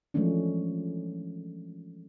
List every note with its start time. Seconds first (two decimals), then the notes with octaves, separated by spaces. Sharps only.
0.14 E3 F3 G#3 A3 C#4 D4